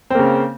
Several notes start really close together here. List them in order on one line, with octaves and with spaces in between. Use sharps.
C4 A#3 C#3